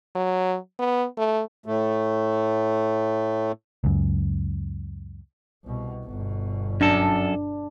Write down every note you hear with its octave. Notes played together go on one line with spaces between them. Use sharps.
F#3
B3
A3
A2 A3
C#2 F#2
C2 B2
G1 B2
F#2 D4 A4